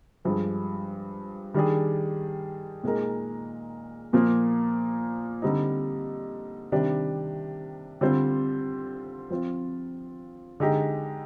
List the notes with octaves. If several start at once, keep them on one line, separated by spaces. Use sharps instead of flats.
G2 F3 G#3
D#3 G3 D4 G#4
A#2 G#3 D#4 A#4
A#2 F3 A#3 F4
D3 G3 C4 D#4
C3 D#3 G3 D4 G4
D3 G3 C4 F4 C5
F3 C4 F4
D3 G#3 D#4 G4